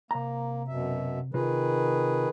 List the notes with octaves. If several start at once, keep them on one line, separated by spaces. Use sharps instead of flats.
C3 A#3 A#5
F#2 B2 E5
C3 D#3 F4 G#4 B4